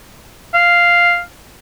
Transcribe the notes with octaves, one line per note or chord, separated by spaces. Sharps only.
F5